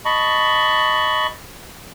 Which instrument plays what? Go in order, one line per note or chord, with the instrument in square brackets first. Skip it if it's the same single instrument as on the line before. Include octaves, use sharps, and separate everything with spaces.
[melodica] D#5 A5 B5 C#6